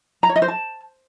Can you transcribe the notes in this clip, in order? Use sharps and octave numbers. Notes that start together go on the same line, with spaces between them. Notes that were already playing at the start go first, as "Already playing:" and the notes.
A#5
C#5
D#5
C5
A5